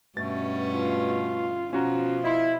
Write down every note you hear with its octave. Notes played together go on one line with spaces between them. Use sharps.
G2 B2 A3 C#4 A6
F4
B2 F3 C#4 F4 F#4 A#5
E4 D#5 C6